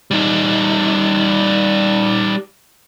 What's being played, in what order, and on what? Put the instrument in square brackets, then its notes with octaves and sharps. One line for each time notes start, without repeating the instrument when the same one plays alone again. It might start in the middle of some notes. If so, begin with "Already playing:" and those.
[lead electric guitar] G3 D#4